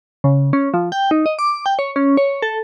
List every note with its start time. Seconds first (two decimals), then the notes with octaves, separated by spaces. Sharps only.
0.24 C#3
0.53 C#4
0.74 F3
0.92 G5
1.11 D#4
1.26 D#5
1.39 D6
1.66 G5
1.79 C#5
1.96 C#4
2.17 C#5
2.42 A4